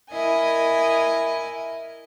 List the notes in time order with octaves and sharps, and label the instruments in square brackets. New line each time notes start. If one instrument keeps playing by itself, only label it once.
[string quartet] E4 A#4 D#5 G#5